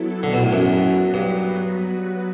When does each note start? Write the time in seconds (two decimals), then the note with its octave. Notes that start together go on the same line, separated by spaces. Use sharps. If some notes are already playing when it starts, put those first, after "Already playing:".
Already playing: F#3 B3 E4 A4
0.23 D3
0.33 B2
0.43 A2
0.53 F#2
0.84 F#3 B3 F#4 B4
1.14 G2